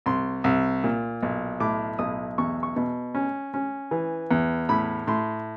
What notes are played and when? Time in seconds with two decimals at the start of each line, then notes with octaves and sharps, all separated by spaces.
0.06 C2 C6
0.44 C2
0.84 A#2
1.23 B1
1.60 A2 D6
1.99 B1 D#6
2.38 E2 C#6
2.63 C#6
2.76 B2
3.15 C#4
3.54 C#4
3.91 E3
4.31 E2
4.69 A2 B5
5.07 A2 C6